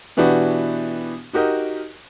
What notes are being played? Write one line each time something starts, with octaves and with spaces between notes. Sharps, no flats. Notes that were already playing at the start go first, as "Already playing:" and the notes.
B2 E3 B3 D4 F#4 G4
D#4 F#4 G4 A#4 D#5